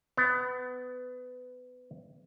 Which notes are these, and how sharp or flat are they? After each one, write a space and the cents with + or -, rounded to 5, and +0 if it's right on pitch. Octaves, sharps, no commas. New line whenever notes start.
B3 +25